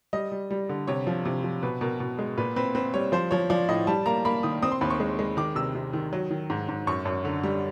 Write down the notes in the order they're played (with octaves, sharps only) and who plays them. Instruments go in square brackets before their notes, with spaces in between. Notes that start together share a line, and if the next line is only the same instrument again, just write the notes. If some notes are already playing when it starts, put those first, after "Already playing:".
[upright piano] G3 D#5
G3
G3
D3
C3 C#5
F3
C3
F3
B2 B4
B2 A#4
B2
G#3
A#2 B4
C4 B4
C4 B4
G3 C#5
F3 C5
F3 C#5
F3 D5
A2 D#5
G3 A5
A#3 A#5
A#3 B5
D#3 D#6
C4 D#6
C6
D#2 B5
C#6
G#3
G#3
D#3 D6
C3 E6
C3
D#3
F#3
D#3
G#2
G#2
F#2 C#6
F#2
D3
G3